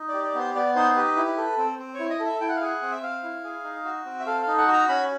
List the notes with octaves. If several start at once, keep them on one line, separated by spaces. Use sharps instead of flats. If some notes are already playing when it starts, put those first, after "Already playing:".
Already playing: D#4
G4 D5
D5
B3 C5
B3 D5
D#4 C5
G4 B4
E4
A4
C4
C4
C#5
E4
D#5
A4
E5
E4 G5
F#5
F5
G#4 F#5
C4
E5
C4 F5
E4
G#4
D#4
F#4
C4
E5
A4 F5
F5
D#4
F#5
F#4
A#5
C#4 B5